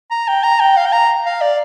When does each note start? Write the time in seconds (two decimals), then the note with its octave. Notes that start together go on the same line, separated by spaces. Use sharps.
0.11 A#5
0.28 G5
0.43 A#5
0.60 G5
0.77 F5
0.86 G5
0.92 A#5
1.26 F5
1.41 D5